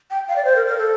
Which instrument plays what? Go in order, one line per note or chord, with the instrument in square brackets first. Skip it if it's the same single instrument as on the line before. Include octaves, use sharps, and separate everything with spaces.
[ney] G5
F5
D5
C5
A#4
A#4
A4